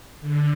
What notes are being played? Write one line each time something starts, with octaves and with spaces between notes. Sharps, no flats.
D3